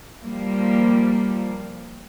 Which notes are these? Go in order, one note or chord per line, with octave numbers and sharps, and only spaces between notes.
F3 G3 A#3